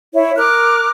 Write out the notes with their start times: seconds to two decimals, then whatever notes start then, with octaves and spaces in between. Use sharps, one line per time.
0.14 E4 C#5
0.37 A#4 D6 F6 F#6